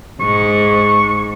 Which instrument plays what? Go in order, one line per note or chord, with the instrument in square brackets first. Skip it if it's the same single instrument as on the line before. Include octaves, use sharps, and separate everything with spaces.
[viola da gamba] G#2 [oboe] C#6